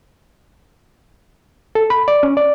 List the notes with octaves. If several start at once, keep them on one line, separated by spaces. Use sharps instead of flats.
A4
B5
D5
C#4
D5